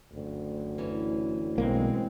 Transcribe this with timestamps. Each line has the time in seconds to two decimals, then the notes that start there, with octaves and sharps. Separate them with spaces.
0.12 F#1 D2
0.78 E3 C#4
1.58 B1 G#3 A#3 C4